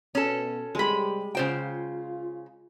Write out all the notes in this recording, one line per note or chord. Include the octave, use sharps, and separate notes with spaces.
B2 B3 C#4 A4
C3 G3 G#3 G4 B5
C#3 F4 C5 G5